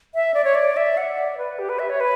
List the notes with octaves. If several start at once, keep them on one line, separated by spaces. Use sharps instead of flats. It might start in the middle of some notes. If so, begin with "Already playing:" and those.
E5
D5
C#5
D5
E5
F#5
D5
B4
G4
B4
E5
C#5
B4